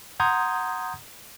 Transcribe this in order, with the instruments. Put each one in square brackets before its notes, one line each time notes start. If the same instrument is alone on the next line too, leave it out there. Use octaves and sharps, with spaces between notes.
[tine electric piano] F#5 A#5 C6 D#6 G6 G#6